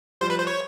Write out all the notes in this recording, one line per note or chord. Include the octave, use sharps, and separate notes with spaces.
F3 G3 C5
B4
C5
C#5